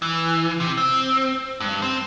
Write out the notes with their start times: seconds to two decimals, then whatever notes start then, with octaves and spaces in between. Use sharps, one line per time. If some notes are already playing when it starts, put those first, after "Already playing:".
0.02 E3
0.60 C3
0.77 C4
1.60 G2
1.82 C4